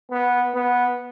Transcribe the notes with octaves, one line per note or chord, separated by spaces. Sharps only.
B3
B3